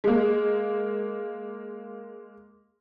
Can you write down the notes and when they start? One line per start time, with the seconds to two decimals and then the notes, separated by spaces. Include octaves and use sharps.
0.04 G#3 A#3